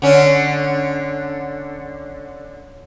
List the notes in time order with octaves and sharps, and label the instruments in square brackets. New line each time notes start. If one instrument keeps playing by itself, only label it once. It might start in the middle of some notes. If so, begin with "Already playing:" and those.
[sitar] D3 C#4